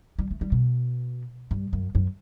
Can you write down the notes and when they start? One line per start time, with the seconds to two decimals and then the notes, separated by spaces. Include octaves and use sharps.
0.19 G3
0.31 A3
0.41 G3
0.52 B2
1.51 G2
1.73 F#2
1.95 F#2